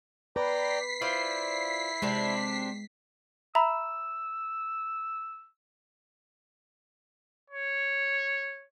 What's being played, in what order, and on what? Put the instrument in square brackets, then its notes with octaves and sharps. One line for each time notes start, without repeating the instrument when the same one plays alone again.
[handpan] B4 [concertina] D5 G5 A#5 [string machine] B6 C7
[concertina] E4 [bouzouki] F4 C5 D5
[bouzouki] C3 C4 D4 [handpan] G#3
[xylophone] E5 A#5 B5 [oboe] E6
[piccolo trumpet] C#5